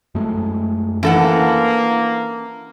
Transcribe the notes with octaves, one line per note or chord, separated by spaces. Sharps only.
F#2 G#3 A3
E3 A#3 C#4 D4 A4 F#5